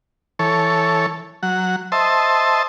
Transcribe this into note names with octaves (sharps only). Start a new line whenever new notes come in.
E3 A4 C#5
F#3 F#5
C5 D#5 E5 A5